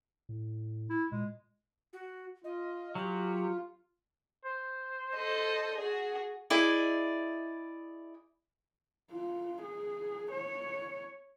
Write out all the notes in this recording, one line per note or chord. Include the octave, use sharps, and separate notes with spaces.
A2
E4
A#2 G#3
F#4
F4 D#5
F#3 G4
C5
A4 D#5
F#4 G#4
E4 G#4 D5 D#5
F4
G#4
C#5